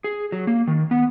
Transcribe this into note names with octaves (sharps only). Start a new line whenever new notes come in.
G#4
F#3
A#3
D#3
B3